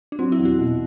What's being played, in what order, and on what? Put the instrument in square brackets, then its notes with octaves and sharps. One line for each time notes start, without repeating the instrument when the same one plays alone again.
[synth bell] D4
[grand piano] F#3 [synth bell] C4
[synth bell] E4
[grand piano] E2
[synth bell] F#4
[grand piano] B2